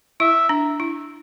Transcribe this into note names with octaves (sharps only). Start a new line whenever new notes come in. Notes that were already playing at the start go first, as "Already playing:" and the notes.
E4 E5
D4
E4